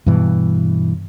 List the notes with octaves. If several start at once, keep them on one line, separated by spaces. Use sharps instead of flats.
G2 B2 E3